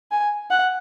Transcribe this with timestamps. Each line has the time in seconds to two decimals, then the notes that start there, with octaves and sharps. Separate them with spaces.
0.11 G#5
0.50 F#5